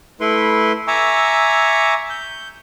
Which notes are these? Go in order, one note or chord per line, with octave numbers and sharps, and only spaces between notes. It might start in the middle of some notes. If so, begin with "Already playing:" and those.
A3 E4 B4 C6
E5 G#5 A#5 C#6 D6 E6
G6